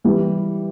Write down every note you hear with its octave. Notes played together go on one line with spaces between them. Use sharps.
E3 G3